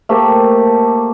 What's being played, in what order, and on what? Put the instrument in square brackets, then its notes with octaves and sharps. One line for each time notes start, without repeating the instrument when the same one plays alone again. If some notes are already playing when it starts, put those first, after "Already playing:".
[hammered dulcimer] A3 A#3 G4 C5